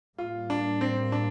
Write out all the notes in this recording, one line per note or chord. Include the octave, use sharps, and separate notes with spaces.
A2 G3 A#3 F4
D4
C4
D4